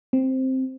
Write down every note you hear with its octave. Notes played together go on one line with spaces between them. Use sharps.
C4